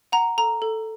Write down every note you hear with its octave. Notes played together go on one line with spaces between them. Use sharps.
F#5 A#5
A4 A#5
A4